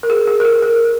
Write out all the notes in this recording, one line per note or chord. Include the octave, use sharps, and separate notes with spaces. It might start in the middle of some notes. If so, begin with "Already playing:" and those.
A#4
G#4
G#4
A#4
G#4
A#4